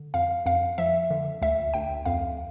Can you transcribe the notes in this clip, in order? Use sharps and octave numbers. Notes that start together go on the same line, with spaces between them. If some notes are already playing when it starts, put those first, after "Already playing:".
Already playing: D3
F2 F5
F2 F5
F3 E5
D3
D2 E5
D2 G5
F2 F5